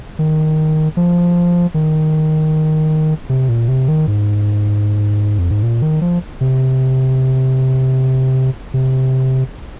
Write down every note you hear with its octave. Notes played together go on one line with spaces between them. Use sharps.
D#3
F3
D#3
C3
A#2
C3
D#3
G#2
F2
G#2
A#2
D#3
F3
C3
C3